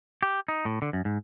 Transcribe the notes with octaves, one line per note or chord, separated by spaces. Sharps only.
G4
D#4
A2
D3
F#2
G#2